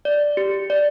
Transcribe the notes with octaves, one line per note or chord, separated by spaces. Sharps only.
D5
G4
D5